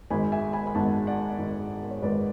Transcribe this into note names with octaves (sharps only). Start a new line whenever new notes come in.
G#1 G#2 G#3 G#5 B5
E5 G#5
G#5 B5
B5
G#1 G#2 G#3 F#5 A5
D5 F#5
G#1 G#2 G#3
C#5
G#1 G#2 G#3 B4 D5